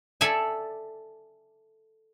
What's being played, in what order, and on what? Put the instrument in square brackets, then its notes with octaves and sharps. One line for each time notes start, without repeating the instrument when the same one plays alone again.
[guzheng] A4 D5 E5 G#5